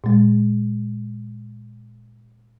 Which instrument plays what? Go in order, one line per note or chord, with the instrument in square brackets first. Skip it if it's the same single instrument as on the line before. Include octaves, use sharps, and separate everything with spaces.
[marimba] A#2 G#3